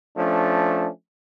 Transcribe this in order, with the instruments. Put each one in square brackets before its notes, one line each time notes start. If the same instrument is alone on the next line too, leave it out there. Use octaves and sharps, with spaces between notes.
[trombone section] F3 A3 C#4 D4